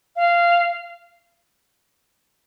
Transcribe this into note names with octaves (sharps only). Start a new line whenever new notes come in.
F5